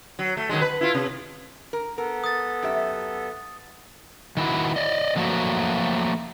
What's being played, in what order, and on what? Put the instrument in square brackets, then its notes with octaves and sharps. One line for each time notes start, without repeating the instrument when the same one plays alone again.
[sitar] F#3
A3
D#3 F#3 G#3
B4
E4 F4
C3
[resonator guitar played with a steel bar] A#4
[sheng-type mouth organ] B3 A4 [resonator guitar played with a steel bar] A#4
[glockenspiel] D#6 A6
[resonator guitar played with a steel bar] F#2 G4 E5
[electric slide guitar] D#3 E4 F#4
D5 D#5
D3 F3 F#3 A3 A#3 F#4